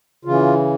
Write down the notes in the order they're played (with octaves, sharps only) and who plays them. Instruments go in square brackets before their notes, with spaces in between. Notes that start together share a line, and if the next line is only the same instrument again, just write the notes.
[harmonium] C#3 E3 F4